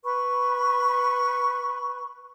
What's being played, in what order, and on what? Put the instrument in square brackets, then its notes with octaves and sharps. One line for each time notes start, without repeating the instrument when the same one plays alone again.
[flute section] B4 B5 C#6